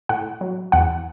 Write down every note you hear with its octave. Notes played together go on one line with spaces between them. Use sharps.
A2 F#5
F#3
E2 F#5